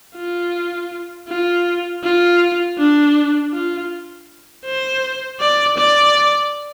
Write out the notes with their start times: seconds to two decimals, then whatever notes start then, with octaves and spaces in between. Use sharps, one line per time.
0.15 F4
1.28 F4
2.03 F4
2.78 D4
3.53 F4
4.66 C5
5.40 D5
5.78 D5